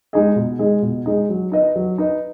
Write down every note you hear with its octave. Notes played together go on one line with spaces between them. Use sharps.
G#3 D#4 G#4 D#5
B2
G#3 D#4 G#4 D#5
B2
G#3 D#4 G#4 D#5
F#3
D#4 B4 D#5
F#3
D#4 B4 D#5